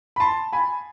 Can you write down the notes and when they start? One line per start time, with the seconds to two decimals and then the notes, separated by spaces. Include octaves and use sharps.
0.16 B5
0.20 A5 C6
0.53 G#5 B5